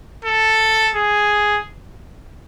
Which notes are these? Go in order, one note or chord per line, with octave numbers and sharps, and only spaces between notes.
A4
G#4